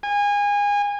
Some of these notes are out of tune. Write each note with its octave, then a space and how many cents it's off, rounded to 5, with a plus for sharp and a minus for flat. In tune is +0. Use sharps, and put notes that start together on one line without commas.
G#5 -25